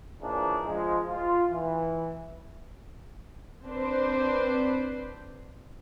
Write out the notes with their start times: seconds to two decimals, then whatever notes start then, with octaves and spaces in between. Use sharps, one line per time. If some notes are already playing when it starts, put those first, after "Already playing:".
0.22 C#3 E3 F3 A#3 D4 D#4
0.64 F3 G#3
1.08 F4
1.51 E3
3.65 C4 D4 B4 C5